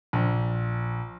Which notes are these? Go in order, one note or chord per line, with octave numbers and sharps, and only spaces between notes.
A#1